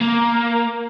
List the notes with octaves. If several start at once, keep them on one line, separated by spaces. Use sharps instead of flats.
A#3